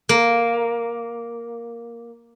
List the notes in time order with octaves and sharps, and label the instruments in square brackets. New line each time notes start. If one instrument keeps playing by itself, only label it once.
[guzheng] A#3